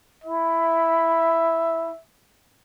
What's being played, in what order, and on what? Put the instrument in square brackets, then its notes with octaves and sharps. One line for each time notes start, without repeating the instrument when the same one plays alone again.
[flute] E4 [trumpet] E5